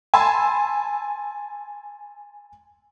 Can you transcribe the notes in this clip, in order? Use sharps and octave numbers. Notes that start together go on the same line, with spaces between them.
G#5 A5 B5 C6 E6